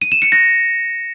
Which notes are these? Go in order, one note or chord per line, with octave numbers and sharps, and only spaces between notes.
D#7
E7
C#7
A#6